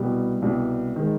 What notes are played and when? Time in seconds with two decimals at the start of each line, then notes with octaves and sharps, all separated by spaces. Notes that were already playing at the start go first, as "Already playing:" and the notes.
Already playing: C2 B2 G3
0.42 C2 B2 G3
0.96 D#3 G#3